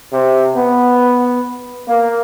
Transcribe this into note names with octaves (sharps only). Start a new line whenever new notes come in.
C3
B3
A#3